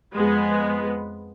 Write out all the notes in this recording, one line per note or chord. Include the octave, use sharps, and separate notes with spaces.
F2 G#3 B3